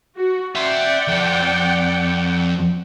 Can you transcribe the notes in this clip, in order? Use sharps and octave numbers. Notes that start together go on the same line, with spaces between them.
F#4
D5 E5 F#5 G5 C6
F2